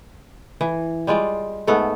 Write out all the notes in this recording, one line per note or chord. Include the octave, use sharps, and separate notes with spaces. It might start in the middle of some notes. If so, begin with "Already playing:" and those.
E3
G3 G#3 F4 D5
G#2 A3 B3 A4